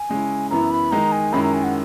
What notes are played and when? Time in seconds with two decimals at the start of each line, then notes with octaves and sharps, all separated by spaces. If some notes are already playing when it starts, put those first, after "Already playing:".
Already playing: G#5
0.09 C#3 G#3 C#4 E4
0.50 F#2 E3 B3 E4 A#5
0.71 B5
0.91 D#3 G#3 D#4 A#5
1.12 G#5
1.33 F#2 D#3 G#3 C#4 E4 B5
1.43 A#5
1.54 G#5
1.64 F#5